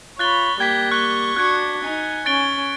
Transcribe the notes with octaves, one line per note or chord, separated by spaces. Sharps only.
F4 C#5 B5 F#6 A6 G7
G3 A#3 G5 G#6 B6
C#6 F#6 G7
D4 F#4 F#6 G#6 C#7
D#4 G#5
C#4 A6 D7 G7